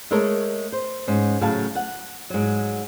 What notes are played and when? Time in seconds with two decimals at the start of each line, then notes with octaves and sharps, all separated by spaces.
0.11 G#3 A3 A4 A#4 C#5
0.72 C5
1.07 G#2 C#4
1.41 A2 C#3 F#3 F#4 F5 A5
1.75 F#5
2.30 G#2 F#3